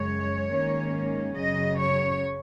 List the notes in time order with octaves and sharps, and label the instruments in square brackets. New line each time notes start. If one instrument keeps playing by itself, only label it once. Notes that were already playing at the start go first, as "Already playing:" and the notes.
Already playing: [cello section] F#2 C#3 G#3 C#5
G#2 D#3 A#3 C#4
F#2 C#3 F#3 D#5
C#5